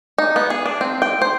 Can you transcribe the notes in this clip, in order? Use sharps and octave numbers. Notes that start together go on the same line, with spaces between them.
D#4
B3
G#4
D4
C4
G5
C5